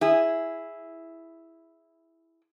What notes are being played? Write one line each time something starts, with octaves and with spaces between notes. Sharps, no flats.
E4 G#4